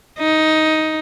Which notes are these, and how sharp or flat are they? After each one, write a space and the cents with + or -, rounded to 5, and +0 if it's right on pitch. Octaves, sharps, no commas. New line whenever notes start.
D#4 +10